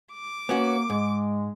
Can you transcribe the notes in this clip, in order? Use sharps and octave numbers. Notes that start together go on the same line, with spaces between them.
D6
A#3 B3 C#4 F#4
G#2 G#3